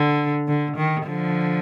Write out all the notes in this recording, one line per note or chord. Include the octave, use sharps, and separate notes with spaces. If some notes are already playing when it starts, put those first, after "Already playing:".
Already playing: D3
D3
D#3
D3 F3